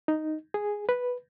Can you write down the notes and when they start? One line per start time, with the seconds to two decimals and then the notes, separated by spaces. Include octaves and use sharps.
0.08 D#4
0.54 G#4
0.89 B4